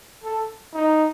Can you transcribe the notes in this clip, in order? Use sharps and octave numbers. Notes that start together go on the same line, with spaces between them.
A4
D#4